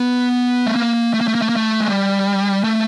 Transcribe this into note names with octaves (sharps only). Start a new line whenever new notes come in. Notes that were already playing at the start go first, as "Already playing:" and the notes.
Already playing: B3
A3
A#3
A3
A#3
A3
A#3
A3
A#3
A3
G#3
G3
A3